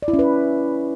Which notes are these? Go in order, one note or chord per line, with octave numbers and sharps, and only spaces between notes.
D5
E4
C#4
B4